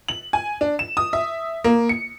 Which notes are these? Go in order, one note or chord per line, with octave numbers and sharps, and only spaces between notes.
F#7
G#5
D4
E7
D#6
E5
A#3
C#7